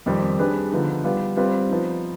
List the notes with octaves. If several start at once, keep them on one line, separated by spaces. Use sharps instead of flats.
F2 D#3 G3 C4 G4
G3 D4 G#4 B4
D3 F3 B3 D#4
G3 B3 F4
G3 C4 F4 B4
F3 B3 D#4